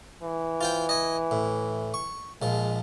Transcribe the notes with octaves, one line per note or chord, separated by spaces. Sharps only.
E3
F4 C5 G5
D#5 G#5
A2
C#6
A#1 F3 G#3